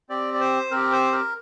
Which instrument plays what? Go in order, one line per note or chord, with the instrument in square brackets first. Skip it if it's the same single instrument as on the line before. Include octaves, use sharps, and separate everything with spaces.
[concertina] C4 G4 D5
D5
C5
C4 G4 A#4
C5
A#4